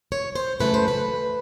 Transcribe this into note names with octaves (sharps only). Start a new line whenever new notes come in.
C#5
C5
F#2 C#3 E3 A3 B4
C5
B4